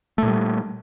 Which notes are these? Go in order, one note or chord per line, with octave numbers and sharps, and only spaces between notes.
A#2 G3 A3